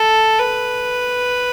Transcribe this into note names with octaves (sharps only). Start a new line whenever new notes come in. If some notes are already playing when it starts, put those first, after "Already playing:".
Already playing: A4
B4